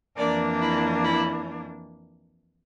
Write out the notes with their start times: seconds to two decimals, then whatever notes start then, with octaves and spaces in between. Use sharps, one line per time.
0.17 F2 E3 A#3 D4 A#4 D5
0.61 E4
1.04 E4